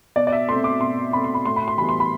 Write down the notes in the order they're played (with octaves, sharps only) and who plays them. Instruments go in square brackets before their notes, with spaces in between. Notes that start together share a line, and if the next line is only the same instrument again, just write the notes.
[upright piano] B2 D5
D5
E5
A3 C4 C6
D6
B2 C6
A3 C4 B5
C6
B5
A2 C6
B5
C6
E3 G3 B3 B5
C6
B5